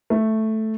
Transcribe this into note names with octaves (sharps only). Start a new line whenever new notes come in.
A3